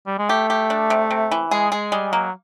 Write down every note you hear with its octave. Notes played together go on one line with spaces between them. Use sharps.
G3
G#3
A3 G4
G4
D4
C3
C3
E3
G#3 G#4
G#3 G#4
G3 G#3
F#3 A#3